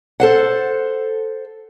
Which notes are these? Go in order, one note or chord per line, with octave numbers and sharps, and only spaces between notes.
A4 C5 F#5